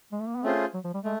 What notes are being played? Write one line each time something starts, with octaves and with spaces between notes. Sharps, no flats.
G#3
A3
A#3
B3
A3 C4 C#4 F4 G#4 C5
F#3
F3
G3
G#3 A3